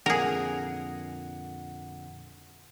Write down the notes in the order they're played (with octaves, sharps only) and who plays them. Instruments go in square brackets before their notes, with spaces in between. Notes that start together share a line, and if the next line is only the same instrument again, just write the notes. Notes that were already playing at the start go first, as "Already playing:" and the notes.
[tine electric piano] F2 A#2 D3 [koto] G#4 A#4 [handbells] F#5